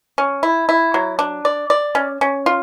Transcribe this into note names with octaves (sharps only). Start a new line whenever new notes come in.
C#4
E4
E4
F#3
D4
D5
D5
C#4
C#4
F4